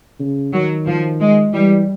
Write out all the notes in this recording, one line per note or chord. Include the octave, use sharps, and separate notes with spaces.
C#3
D#3 F#3
F3
G#3
E3 G3